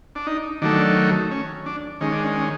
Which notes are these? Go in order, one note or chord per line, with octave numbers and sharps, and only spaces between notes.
D4
D#4
D#3 F#3 A3 D4
C#4
D4
D#3 G#3 C#4
D4
C#4
C#4